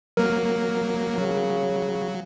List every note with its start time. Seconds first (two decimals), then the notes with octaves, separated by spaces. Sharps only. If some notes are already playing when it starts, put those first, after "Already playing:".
0.17 F#3 A#3 A#4
1.18 C#3 F#3